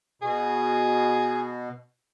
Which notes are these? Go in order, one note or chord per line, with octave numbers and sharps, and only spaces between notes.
B2 G#4